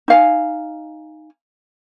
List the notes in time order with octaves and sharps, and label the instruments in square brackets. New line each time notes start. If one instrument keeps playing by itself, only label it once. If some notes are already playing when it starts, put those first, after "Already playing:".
[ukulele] D#4 F5 G#5